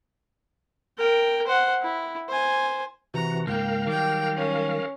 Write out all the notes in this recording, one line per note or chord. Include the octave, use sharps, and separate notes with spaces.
A#4 G5
C5 F#5
E4
C5 G#5
C3 E3 F#4 A#5
C#2 G#2 A#3 A#4 F5 G5
D#3 F#3 G3 G5 D6
C#4